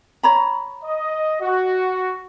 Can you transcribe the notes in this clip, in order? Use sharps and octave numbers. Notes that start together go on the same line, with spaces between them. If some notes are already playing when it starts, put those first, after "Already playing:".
C#5 A#5 B5
D#5
F#4